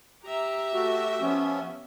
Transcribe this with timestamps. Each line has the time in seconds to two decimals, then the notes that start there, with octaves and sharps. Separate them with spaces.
0.24 G4 E5 A#5
0.73 A3 F#4
1.21 F3 B3 C#4